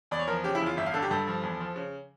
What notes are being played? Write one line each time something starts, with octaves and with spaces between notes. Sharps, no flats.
E2 D5
C#5
F3 A#4
C#3 G4
E4
E2
F4
G1 E5
F5
D3 A4
G4
G2 A4
F3
E2
F3
C#3